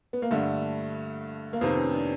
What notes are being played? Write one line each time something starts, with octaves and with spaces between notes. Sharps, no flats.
B3
A#3
G2 D3 G3 A3
A#3
F2 C3 D#3 B3
C#4
D4